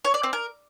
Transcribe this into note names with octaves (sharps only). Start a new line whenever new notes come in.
C#5
D5
C4
A#4